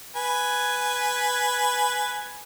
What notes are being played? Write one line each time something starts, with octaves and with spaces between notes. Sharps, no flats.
B4 G#5